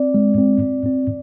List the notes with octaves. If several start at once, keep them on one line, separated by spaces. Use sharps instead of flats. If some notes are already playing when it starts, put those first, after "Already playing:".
Already playing: C4 D5
G#3
C4
C4
C4